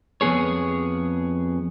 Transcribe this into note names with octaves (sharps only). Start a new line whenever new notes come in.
F2 B2 B3 G#4 C#5